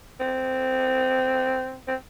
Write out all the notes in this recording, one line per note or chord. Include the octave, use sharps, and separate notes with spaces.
C4
C4